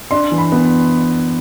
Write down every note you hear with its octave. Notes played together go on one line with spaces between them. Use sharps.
D4 C6
E3
B5
B3